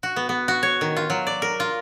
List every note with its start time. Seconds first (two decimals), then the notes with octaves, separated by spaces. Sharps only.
0.03 F#4
0.16 B3
0.29 B3
0.48 F#4
0.63 C#5
0.81 D#3
0.97 F4
1.10 F#3
1.27 D5
1.42 A#4
1.60 F4